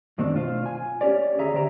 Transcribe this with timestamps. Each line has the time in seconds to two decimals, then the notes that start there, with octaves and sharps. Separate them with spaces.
0.18 F#2 D#3 A3 C4 D4
0.34 B1 F4 C5
0.66 G#5
1.01 C#4 G4 C#5 D5
1.38 D2 G#4 E5 A#5
1.54 D3 G4 C5 G5 A#5